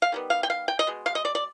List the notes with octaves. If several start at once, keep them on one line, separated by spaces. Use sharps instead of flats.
F5
D#3 G3 B3
F5
G5
F5
G5
D#5
B2 G#3
F5
D#5
D5
D5